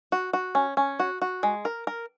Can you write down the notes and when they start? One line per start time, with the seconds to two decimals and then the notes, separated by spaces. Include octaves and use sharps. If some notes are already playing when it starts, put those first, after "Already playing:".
0.12 F#4
0.33 F#4
0.55 C#4
0.77 C#4
1.00 F#4
1.22 F#4
1.43 G#3
1.65 A#4
1.87 A#4